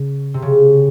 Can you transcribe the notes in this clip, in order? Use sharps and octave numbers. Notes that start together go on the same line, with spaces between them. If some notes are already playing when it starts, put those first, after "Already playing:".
Already playing: C#3
C3
C#3